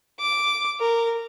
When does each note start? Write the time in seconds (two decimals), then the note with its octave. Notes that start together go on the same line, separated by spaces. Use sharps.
0.19 D6
0.80 A#4